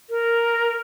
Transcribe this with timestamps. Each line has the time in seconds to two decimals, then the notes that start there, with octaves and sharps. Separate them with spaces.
0.10 A#4